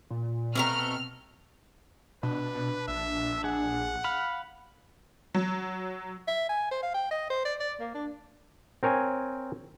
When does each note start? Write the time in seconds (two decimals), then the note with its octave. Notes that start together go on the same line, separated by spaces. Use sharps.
0.11 A#2
0.55 B2 A3 C4 A#5 F6
2.23 B2 D4 B4
2.88 A#1 E5
3.44 G#4 F#5
4.04 F5 B5
5.34 F#3
6.28 E5
6.49 G#5
6.71 C5
6.83 F5
6.94 G5
7.11 D#5
7.30 C5
7.45 D5
7.60 D5
7.79 A#3
7.94 D4
8.83 C4 A#4 C#5 G#5